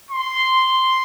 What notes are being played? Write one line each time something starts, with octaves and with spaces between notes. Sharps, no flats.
C6